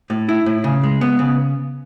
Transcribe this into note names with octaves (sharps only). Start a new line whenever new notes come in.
A2
E4
A2
C#3
G#3
B3
C#3